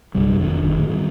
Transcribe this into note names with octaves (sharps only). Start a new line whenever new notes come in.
A#1 F#2 C3 G3
F1 D#3 D4
G1 D#3
A2 D#3
G2 D#3